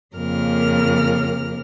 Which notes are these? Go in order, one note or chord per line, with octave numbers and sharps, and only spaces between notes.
F2 C#3 A#3 A#4 F6